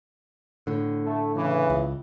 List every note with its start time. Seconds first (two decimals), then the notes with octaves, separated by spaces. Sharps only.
0.67 A2 D3
1.05 A3
1.35 C#3 E3
1.70 C#2